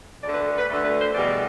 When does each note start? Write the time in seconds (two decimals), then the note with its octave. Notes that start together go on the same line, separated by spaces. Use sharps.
0.23 D2 D3 A3 D5
0.34 B4
0.47 A4
0.58 B4
0.68 D2 D3 A3 A4
0.85 B4
1.00 C5
1.14 E2 B2 G3 D5